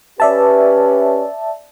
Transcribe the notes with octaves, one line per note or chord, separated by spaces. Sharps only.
C#4 G4 B4 D5 E5 A5